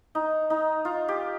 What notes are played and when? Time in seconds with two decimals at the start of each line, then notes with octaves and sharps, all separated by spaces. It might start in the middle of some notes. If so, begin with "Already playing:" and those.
0.15 D#4
0.50 D#4
0.85 F4
1.08 G4